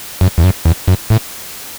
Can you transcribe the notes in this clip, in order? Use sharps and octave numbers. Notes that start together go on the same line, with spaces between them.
F#2
E2
F#2
E2
F#2
A2